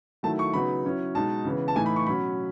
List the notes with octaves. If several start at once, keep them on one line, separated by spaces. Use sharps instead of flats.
D#3 F#3 A3 E4 A5
C#6
C#3 F#3 B3 D#4 B5
F#3 C#4 E4
B2 G#3 D#4 A5
C#3 E3 B3
A5
A2 E3 A3 D#4 G#5
B5
C#6
B2 F#3 C#4 B5